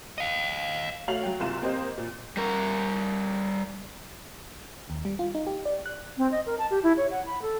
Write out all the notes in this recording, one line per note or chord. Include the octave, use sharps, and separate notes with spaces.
D#5 F5
A3 F#4 C#5 F5 F7 F#7
F#3 G5
F#1 F#2 C3 F4 C6 E7
A#3 C4 G4 C5 D#5
A#2
G3 A#4
D#2
G3
F4
D#4
G4
D5
F#6
C4
D#5
A#4
A5
G4
E4
C#5
F#5
B5
A4